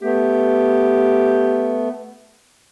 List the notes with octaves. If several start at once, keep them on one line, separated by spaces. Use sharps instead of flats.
A3 B3 G4